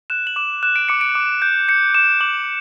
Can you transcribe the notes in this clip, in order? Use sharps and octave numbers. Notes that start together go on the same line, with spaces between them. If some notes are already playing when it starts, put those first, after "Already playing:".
F#6 E7
F#7
D6 E7
F#6 E7
D7
D6 C#7
D7
D6
G6
G6 C#7
D6 E7
D6 F#7